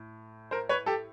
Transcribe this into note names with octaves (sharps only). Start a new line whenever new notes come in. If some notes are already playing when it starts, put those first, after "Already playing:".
Already playing: A2
A#4 C5
B4 C#5
G4 A4